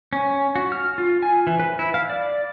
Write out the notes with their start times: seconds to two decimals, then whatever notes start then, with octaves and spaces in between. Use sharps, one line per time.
0.13 C#4
0.56 F#4
0.72 F6
0.98 F4
1.23 G#5
1.47 E3
1.60 B4
1.79 E4
1.94 F5
2.10 D5